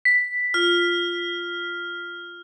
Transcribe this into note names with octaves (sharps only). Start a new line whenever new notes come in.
B6
F4 F6